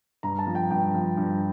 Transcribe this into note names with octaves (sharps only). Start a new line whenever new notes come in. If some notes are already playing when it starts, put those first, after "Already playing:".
G2 A#5
A5
F3
G5
G2 G5
F3
G2